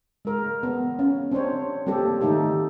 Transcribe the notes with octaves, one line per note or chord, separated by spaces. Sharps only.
G#3 A#4
B3
C#4
C4 D4 C5 C#5
G3 A#3 C4 G4 A4
D#3 A3 D#4 G4 A4